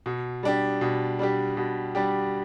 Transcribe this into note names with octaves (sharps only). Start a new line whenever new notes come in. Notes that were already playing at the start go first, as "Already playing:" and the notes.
B2
G3 D4 G4
B2
G3 D4 G4
B2
G3 D4 G4